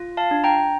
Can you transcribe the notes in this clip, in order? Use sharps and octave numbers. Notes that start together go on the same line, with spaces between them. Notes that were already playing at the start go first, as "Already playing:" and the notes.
Already playing: F4
F5 A5
D4
G5 A#5